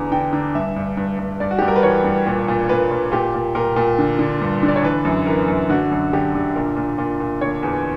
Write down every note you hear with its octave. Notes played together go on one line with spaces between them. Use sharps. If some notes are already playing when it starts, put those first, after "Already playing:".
Already playing: E2 D3 A#5
D3 G5
D3
G2 E5
G2
G2
G2
G2 D5
F#4
G4
G2
A#4
B4
E3 C#5
G2
A#2
A#2
A#2 B4
A#2
A#2 G4
A#2
A#2 A#4
A#2
D3
D3
G2
D3
D5
C#5
E3 B4
F#2
E3 A#4
F#2
D3 F#4
F#2
D3 G4
D3
A#2 A#4
A#2
A#2
A#2
D3 C#5
E2